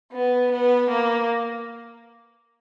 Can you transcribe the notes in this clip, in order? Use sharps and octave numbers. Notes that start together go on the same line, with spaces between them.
B3
B3
A#3